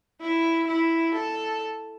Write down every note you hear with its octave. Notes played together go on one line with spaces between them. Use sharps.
E4
E4
A4